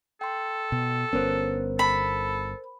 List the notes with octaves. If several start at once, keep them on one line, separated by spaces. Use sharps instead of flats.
A4 G5 C6
B2
G1 B3 C#4 A#4 C5
A4 B5